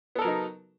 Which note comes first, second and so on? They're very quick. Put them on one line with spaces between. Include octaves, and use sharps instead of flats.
B3 A4 A#4 F#3 D#4